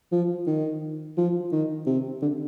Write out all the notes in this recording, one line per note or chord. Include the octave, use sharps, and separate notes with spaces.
F3
D#3
F3
D#3
C3
D3